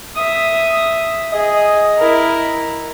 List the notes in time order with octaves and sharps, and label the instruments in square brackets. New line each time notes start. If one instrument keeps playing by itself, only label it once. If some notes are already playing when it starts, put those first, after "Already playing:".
[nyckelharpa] E5 D#6
[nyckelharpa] G#4 [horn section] D#5
[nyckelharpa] E4 A#4